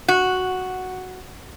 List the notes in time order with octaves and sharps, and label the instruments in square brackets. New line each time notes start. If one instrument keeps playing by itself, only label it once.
[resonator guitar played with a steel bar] F#4